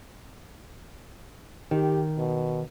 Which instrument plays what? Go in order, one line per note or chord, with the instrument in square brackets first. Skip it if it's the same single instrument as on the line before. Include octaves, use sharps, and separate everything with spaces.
[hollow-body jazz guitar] D#3 [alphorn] G4
[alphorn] B2